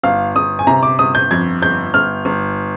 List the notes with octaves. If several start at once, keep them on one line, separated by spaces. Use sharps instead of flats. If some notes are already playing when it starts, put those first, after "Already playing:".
G1 F5
G1 D#6
G#5
C3 A#5
D6
G1 D#6
G6
F2 G#6
G1 G6
G1 F6
G1